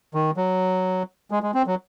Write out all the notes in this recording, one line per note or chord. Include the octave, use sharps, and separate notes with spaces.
D#3
F#3
G#3
G#3
C4
F#3